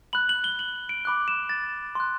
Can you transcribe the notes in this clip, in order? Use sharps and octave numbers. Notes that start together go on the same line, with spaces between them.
B5 F#6 F#7
F#7
G7
F#7
D7
B5 D6 F#6
E7
A6
C6 F#6